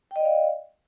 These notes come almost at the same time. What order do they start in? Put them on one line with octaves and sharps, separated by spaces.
G5 D#5 D5 F5